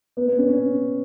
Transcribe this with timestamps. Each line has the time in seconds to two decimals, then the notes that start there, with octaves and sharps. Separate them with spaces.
0.17 B3
0.28 B3
0.38 C#4
0.49 C#4